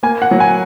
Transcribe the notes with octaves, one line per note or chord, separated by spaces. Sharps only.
A#3 G#5
F#5
F#3
G#5